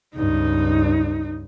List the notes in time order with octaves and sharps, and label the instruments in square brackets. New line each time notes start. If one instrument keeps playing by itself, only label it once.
[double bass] C#2 G2 [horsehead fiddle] D#4